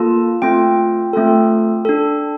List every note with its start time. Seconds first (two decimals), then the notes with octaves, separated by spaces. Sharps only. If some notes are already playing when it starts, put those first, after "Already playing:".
Already playing: A#3 F4 A4 A5
0.42 A3 C4 F4 A4 G5
1.13 A3 C4 F4 A4
1.85 D4 A4